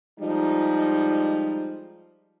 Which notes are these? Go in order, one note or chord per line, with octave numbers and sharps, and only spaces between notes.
F3 G3 G#3 D#4